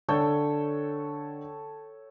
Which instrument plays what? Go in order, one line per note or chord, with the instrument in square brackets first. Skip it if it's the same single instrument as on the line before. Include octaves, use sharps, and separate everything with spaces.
[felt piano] D3 [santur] A4 C#5 G5